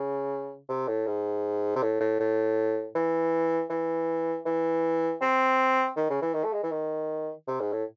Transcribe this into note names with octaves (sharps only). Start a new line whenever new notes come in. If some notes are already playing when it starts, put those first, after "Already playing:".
Already playing: C#3
C3
A2
G#2
C3
A2
A2
A2
E3
E3
E3
C4
D#3
C#3
E3
D#3
A3
G#3
E3
D#3
C3
G#2
A2